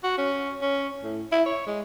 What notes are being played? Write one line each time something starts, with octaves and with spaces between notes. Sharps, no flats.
F#4
C#4
C#4
A2
E4
C#5
G#3